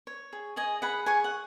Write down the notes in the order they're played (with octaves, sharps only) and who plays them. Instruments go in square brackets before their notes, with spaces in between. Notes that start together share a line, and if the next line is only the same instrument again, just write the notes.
[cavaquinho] C#5
G#4
G#4 D#5 G#5
G#4 F#5 B5
G#4 G#5 C#6
F#5